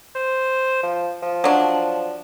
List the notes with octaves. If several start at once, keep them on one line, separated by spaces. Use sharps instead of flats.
C5
F3
F3
F#3 D4